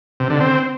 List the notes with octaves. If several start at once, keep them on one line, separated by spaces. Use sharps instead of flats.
C3
D3
C4